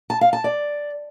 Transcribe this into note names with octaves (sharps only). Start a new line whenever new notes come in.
A5
F5
A5
D5